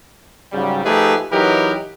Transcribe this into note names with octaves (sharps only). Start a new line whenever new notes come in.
G#2 C#3 F#3 G3
F3 A3 D#4 G4 G#4 B4
E3 F#3 D#4 G4 A#4 B4